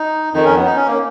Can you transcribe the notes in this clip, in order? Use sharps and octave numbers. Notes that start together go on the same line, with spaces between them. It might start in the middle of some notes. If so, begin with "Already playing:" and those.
Already playing: D#4
F2 D#3 D#4
C#4
B3
D#4
C#4
A#3